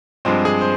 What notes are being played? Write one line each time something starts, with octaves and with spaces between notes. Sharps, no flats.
G2 F3 G#3 C4
G#4
C5